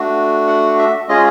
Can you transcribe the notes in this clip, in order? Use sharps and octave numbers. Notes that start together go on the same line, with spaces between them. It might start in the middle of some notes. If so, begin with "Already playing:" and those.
Already playing: A3 D4 F#4
F#5
E5
G#3 C#4 F4 G#4 D#5